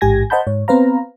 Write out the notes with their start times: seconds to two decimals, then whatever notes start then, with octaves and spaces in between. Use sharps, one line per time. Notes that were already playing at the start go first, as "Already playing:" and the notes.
0.01 A1 G#2 G4 G#5 G#6 A#6
0.30 C5 D#5 F#5 A5 B5 G6
0.47 G#2 C#5
0.68 B3 C4 B4 C5 F5 A#5